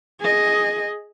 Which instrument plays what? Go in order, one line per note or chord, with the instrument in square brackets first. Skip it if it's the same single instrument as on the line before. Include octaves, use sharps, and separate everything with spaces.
[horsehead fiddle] G#4 D#5